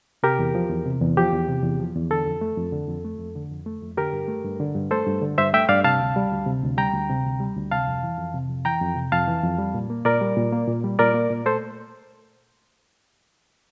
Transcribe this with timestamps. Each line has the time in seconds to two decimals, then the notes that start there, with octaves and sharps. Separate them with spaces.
0.23 C3 G4 A#4
0.39 E2
0.55 F3
0.70 E2
0.86 C3
1.01 E2
1.17 F3 G4
1.32 E2
1.48 C3
1.63 E2
1.79 F3
1.95 E2
2.10 D3 A4
2.26 F2
2.41 A3
2.58 F2
2.73 D3
2.88 F2
3.04 A3
3.20 F2
3.35 D3
3.51 F2
3.66 A3
3.82 F2
3.97 D3 G4 A#4
4.13 G2
4.28 A3
4.45 G2
4.60 D3
4.75 G2
4.91 A3 A4 C5
5.06 G2
5.22 D3
5.38 G2 C5 E5
5.53 A3 E5 G5
5.69 G2 D5 F5
5.84 C3 F5 A5
6.01 D2
6.16 G3
6.32 D2
6.46 C3
6.63 D2
6.78 G3 G5 A#5
6.94 D2
7.10 C3
7.25 D2
7.40 G3
7.56 D2
7.71 C3 F5 A5
7.87 F2
8.03 E3
8.18 F2
8.34 C3
8.49 F2
8.65 E3 G5 A#5
8.81 F2
8.96 C3
9.12 F2 F5 A5
9.28 E3
9.43 F2
9.59 G3
9.74 A#2
9.90 A#3
10.05 A#2 A#4 D5
10.21 G3
10.37 A#2
10.52 A#3
10.68 A#2
10.84 G3
10.99 A#2 A#4 D5
11.14 A#3
11.30 A#2
11.46 A3 A4 C5